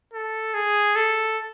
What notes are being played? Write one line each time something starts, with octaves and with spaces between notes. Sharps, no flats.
A4
G#4
A4